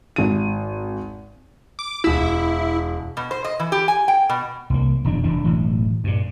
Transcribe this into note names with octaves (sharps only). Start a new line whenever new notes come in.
G#1 D#7
D6
E1 E4 B6
B2
C5
D#5
E3
G4
G#5
G5
B2
C2 A#3
D#1 F2 B2 D4
F1 E2 E3 D4
E1 A2 E3 F#3
G2 A#2